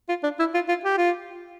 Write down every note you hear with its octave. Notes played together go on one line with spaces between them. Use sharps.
F4
D4
E4
F4
F4
G4
F4